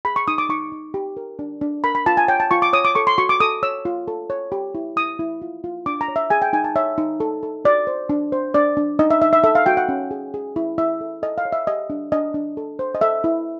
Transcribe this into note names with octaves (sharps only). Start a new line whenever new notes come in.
G#4 B5
C#6
D#4 D#6
D6
D#4 C#6
D#4
G4
A#4
D4
D4
A#4 B5
B5
F4 A5
G#5
C#5 G5
A5
F4 C#6
D6
C#5 D#6
D6
A4 C#6
C6
F#4 C#6
D6
A4 D#6
C#5 E6
F4
A4
C#5
G4
E4
E4 D#6
E4
F4
F4
D4 D6
A#5
C#5
E5
G#4 G#5
G5
D#4 G#5
A5
C#5 E5
D#4
A4
A4
F#4 D5
C5
D4
C5
D4 D5
D4
D#4 D#5
E5
D#4 E5
E5
A4 E5
F5
F#4 G5
F#5
C#4
G#4
G#4
E4
E4 E5
A4
A4 D#5
F5
C#5
E5
G4 D#5
D4
D4 D#5
D4
A4
C5
D#5
A4 E5
E4